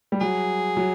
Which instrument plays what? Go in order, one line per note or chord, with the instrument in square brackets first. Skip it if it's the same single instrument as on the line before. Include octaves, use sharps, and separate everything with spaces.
[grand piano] G3
[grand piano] F#3 [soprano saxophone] G#4
[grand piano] F#3